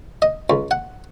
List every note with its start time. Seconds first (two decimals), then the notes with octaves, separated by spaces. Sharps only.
0.22 D#5
0.50 C#2
0.71 F#5